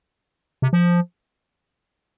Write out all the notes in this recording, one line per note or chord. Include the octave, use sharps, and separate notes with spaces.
C3
F3